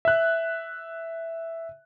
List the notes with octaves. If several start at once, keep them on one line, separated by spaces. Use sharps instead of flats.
E5 F#6